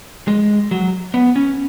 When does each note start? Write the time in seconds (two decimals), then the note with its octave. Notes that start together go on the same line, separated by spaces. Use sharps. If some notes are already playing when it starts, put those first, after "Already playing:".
0.28 G#3
0.71 F#3
1.14 B3
1.36 C#4